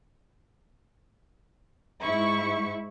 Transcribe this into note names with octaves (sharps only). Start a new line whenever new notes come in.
G#2 E4 C#6